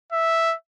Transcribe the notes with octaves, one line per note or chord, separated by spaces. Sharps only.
E5